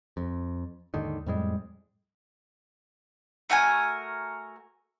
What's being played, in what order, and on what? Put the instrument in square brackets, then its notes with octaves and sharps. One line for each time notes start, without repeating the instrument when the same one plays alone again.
[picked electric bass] F2
D#2 G#2 D3 D#3
F2 A2 G3 G#3
[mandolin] A3 F#4 A#4 G#5